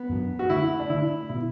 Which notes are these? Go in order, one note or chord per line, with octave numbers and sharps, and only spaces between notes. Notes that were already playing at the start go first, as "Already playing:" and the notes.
Already playing: B3
F#2 F#3 D4
F#4
D3 A3 D4 E4
D4
D3 A3 D4 E4
B2 B3 E4